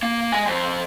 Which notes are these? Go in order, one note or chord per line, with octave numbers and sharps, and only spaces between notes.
A#3
G#3 G#5
F2 F3